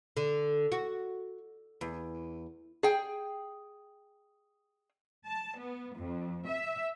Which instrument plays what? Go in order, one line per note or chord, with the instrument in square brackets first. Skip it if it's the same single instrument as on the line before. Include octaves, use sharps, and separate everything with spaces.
[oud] D3
F#4
E2
[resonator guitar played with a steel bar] G#4 G5
[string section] A5
B3
F2
E5